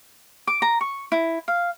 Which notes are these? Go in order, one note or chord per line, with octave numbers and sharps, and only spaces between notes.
D6
A#5
C#6
E4
F5